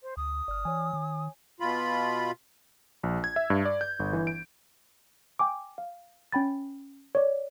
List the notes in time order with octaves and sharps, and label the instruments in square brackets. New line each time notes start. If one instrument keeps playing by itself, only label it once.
[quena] C5
[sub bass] D2 [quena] D#6
[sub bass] G1 [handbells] D5 F6
[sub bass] E3 [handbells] C#5 G#5
[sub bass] D#3
[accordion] B2 F4 B5
[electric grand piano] A#1
G#6
E5
G2
D5
G6
G1
E3
D7
[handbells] G5 G#5 D6
F5
C#4 G5 B5 A6
C#5 D5